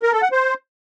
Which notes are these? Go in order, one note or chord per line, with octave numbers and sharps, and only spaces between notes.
A#4
A4
F#5
C5